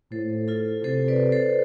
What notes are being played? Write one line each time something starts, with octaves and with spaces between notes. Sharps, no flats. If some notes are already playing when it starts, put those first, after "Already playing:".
A2 A4 C5
F4 A4
C3 A4 C5
B4 D5
A4 C5